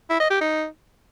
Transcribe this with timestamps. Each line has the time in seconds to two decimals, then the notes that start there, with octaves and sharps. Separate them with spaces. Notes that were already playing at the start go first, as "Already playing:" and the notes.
0.10 E4
0.20 D#5
0.30 G4
0.41 D#4